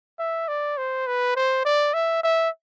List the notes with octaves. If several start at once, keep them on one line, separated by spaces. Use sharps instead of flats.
E5
D5
C5
B4
C5
D5
E5
E5